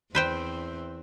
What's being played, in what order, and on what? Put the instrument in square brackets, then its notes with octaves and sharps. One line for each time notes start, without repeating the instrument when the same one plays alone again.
[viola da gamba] E2 C4 [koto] B4 C5 G5